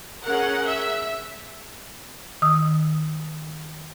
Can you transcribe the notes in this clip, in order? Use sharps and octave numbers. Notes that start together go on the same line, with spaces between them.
C#4 G#4 A#4 F#5
E5
D#3 D#6 E6